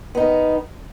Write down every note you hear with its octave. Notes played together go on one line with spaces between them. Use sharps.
D#3 B3 D#4